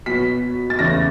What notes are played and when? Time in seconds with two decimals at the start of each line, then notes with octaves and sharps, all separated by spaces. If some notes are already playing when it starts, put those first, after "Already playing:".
0.06 B2 F#3 B3 B6
0.70 A6
0.79 E2 C#3 E3 A3 C#4 A#6